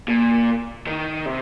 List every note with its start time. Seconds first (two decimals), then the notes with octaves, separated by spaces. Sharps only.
0.08 A#2
0.87 D#3
1.26 C3